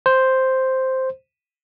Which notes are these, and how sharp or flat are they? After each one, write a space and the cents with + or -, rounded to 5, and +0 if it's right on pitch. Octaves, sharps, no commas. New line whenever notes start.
C5 +0